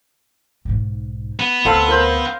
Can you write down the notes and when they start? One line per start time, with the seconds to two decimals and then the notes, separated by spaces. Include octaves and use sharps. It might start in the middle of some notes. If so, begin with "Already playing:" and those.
0.65 B1 G#2
1.40 B3
1.65 D2 C4 A4 F5
1.88 A#4 C5